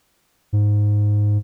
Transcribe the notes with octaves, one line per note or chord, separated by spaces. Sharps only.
G#2